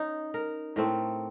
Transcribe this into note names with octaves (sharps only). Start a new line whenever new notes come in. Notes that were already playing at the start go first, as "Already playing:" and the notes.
Already playing: C#4 D#4
A#4
A2 A3 C4 A#4